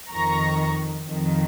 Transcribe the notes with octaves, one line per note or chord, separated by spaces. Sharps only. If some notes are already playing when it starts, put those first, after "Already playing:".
F2 D#3 A#5 C#6
F2 D#3